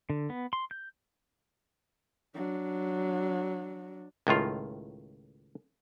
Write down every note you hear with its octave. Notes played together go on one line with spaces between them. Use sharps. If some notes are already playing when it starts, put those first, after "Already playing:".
D3
B3
C6
G6
F#3 D4
C#2 A2 D#3 F4